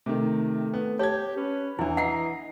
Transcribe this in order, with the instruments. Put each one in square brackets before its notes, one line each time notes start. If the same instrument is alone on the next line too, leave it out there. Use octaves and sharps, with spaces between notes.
[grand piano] C3 D#3 [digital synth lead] A3
[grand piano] B3
[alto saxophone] G4 [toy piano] C#5 [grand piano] A5 G#6
[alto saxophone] C#4 [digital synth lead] B4
[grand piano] E2 [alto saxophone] E3 [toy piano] D4 E4
[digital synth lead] D#5 [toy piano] F#5 [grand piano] A#5 C7